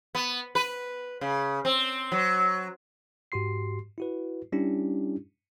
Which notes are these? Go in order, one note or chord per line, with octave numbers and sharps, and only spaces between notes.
B3
B4
C#3
C4
F#3
G#2 F#4 G4 C6 C7
E4 F#4 B4
G3 C#4 D4 E4 G4